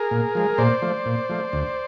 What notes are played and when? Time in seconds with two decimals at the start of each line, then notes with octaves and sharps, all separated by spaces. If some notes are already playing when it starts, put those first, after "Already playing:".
Already playing: G#4 A#4
0.11 A#2
0.35 F3 G#3
0.58 A#2 C5 D5
0.82 F3 A3
1.05 A#2
1.29 F3 A3
1.53 D2